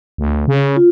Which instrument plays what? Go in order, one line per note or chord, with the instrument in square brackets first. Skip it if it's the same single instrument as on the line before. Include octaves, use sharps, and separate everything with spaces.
[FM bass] D2
C#3
[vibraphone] F4